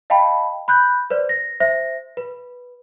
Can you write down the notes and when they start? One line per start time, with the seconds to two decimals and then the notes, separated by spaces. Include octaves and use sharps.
0.10 D#5 F5 G5 A5 B5
0.68 B5 F#6 G6
1.10 B4 C5 D5
1.29 A#6
1.60 C5 E5 A#6
2.17 B4